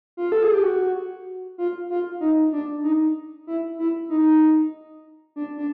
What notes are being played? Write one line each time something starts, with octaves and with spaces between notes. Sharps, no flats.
F4
A4
G#4
G4
F#4
F4
F4
D#4
D4
D#4
E4
E4
D#4
D4
D4